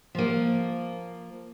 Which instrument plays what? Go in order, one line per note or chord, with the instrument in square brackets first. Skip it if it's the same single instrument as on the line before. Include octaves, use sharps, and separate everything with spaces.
[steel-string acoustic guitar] F3 A#3